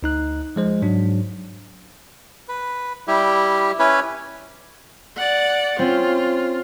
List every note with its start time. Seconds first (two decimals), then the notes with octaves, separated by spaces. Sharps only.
0.03 D2 D#4 F#6
0.56 F3 G#3 C5
0.82 G#2 F#3 D4
2.48 B4
3.07 G3 E4 G4
3.79 C#4 E4 B4 C#5
5.16 D5 F#5
5.79 C4 C#4 F4